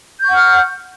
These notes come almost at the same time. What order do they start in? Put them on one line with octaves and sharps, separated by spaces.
G6 C#6 F#5 F6